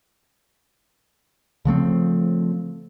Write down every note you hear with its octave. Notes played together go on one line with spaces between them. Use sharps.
C#3 F3 A3 C4